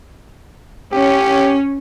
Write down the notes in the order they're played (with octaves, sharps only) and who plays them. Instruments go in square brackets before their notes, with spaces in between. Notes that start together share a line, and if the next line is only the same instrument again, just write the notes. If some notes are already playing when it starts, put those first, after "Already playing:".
[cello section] C#4 [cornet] G4